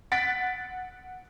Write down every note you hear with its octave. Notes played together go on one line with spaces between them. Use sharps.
F#5 A6 B6 D7